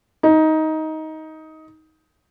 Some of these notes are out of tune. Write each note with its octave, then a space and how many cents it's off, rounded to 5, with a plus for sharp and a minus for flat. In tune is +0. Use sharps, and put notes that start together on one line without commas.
D#4 +15